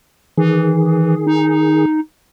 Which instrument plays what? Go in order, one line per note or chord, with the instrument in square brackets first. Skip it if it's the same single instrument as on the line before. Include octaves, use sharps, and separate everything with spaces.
[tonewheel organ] D#3 G#4 [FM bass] E3
[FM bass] D#4